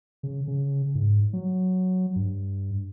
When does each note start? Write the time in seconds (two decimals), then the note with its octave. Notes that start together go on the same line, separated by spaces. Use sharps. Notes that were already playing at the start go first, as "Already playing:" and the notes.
0.23 C#3
0.48 C#3
0.95 G#2
1.33 F#3
2.16 G2